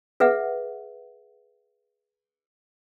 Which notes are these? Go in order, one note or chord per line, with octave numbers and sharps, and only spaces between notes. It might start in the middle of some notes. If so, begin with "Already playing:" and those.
G#4 B4 E5 F#5